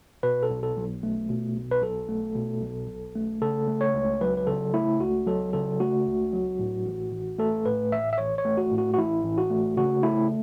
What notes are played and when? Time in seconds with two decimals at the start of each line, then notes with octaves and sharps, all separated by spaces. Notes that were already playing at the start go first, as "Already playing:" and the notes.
0.23 B2 B4
0.43 A4
0.50 B1
0.63 A4
0.76 B1
1.03 A3
1.30 B2
1.55 B1
1.71 B4
1.83 B1 A4
2.09 A3
2.35 B2
2.61 B1
2.88 B1
3.15 A3
3.42 C#3 A4
3.68 A3
3.81 C#5
3.94 C#2
4.21 F#3 B4
4.37 B4
4.47 C#3 A4
4.74 A3 E4
5.00 C#2 F#4
5.27 F#3 A4
5.53 C#3 A4
5.80 A3 F#4
6.06 C#2
6.33 F#3
6.59 A2
6.86 A1
7.12 A1
7.38 A3 A4
7.65 A2 B4
7.92 A1 E5
8.13 E5
8.18 A1 C#5
8.38 C#5
8.45 A3
8.57 F#4
8.72 A2
8.78 F#4
8.94 F#4
8.97 A1 E4
9.24 A1
9.38 F#4
9.50 A3
9.77 C#3 F#4
10.03 A3 E4